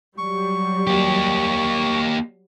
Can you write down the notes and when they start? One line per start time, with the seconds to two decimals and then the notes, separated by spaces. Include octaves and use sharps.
0.18 F#3 G3 C#6
0.87 A#3 G4